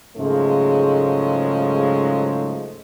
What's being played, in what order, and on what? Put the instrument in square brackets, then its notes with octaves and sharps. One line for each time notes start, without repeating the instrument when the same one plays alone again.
[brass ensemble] G#2 C#3 F3 F#3 G#3 A3